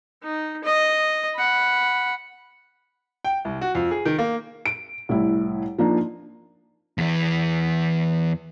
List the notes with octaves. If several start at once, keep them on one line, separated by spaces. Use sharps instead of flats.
D#4
D#5
F#5 B5
G5
C2
F#4
F2
G#4
D#3
A#3
D7
C2 A2 E4
F3 A#3 D4 D#4
E2 E3